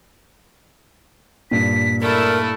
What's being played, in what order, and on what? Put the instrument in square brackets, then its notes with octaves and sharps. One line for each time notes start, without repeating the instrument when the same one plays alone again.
[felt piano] G2 A#2 [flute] B6
[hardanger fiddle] A3 E4 [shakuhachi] A#4 [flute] D5